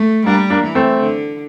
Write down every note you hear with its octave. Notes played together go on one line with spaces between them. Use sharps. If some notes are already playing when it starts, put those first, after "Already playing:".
Already playing: A3
G3 A#3 D4
A#3 D4
E3
A3 C4
D3